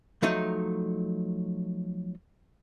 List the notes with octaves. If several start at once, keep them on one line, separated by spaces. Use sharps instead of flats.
F3 F#3 A3 D#4